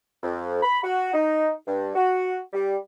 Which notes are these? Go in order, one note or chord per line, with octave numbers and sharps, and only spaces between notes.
F2
B5
F#4
D#4
G2
F#4
G3